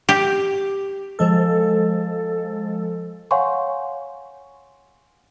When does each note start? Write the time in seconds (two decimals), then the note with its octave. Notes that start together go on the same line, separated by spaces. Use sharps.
0.09 G4
1.19 F3 G#3 A4
3.31 C#5 F5 F#5 G#5 C6 C#6